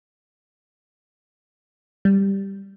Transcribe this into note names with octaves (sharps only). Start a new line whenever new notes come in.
G3